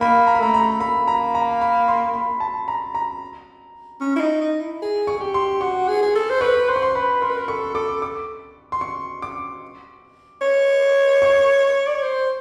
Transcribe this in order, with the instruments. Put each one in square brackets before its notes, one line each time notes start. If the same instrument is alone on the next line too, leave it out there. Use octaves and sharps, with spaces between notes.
[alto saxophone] A#3 [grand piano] B5
[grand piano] A#5
B5
[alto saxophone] A3 [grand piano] A#5
[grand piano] A#5
[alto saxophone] A#3 [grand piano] B5
[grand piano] A#5
A#5
B5
C6
B5
A5
A#5
A#5
[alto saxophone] C#4
E4
D#4
D#4
E4
G#4
[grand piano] C#6
[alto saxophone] G#4
G4
[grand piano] C6
[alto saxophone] F#4 [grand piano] C#6
[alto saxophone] G#4
G#4
A4
C5
[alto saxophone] B4 [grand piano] C#6
[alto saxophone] C5 [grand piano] C6
[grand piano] C#6
C6
[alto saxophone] B4 [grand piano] B5
[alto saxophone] A#4 [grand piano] C6
[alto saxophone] B4
A#4
[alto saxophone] A4 [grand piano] C#6
[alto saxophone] A4 [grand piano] D6
[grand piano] D6
C6
C#6
D6
[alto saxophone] C#5
[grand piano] C#6
[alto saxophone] D5
C#5
C5